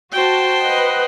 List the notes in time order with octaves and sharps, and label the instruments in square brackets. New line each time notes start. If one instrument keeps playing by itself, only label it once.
[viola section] F#4 A5 [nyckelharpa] C5 G5
[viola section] B4 D#5 F#5